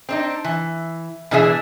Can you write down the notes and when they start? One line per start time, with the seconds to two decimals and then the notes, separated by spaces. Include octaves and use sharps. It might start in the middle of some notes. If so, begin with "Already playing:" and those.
0.09 C4 D4 D#4
0.44 E3
1.31 B2 E3 D4 G#4 A#4 E5